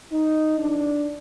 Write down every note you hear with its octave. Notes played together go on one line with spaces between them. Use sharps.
D#4
F2 C#3 E3 D4